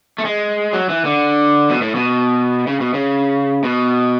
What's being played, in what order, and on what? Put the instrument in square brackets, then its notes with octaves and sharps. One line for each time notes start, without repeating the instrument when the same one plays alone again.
[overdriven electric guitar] A3
G#3
F#3
E3
D3
B2
A2
B2
C#3
B2
C#3
B2